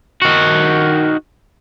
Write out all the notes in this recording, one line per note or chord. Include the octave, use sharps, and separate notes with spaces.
D#3 F#4